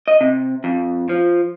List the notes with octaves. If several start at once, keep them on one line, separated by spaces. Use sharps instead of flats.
D#5
C3
F2
F3